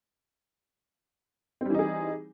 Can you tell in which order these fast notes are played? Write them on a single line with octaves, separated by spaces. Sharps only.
C4 G3 E3 D#4 G#4